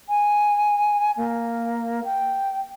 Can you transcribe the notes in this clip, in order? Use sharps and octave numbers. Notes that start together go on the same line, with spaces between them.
G#5
A#3
G5